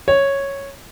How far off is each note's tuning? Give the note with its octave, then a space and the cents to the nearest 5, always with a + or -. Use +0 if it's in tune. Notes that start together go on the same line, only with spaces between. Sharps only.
C#5 -5